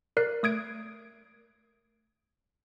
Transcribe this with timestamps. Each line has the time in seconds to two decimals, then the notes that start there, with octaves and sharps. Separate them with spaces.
0.17 A#4 D5 F#6 C7
0.43 A3 D#6 G#6 D7